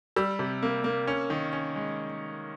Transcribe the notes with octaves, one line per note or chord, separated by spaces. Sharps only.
G3 E6
C3
A#3
A#3
C#4
D#3
C#4
G#3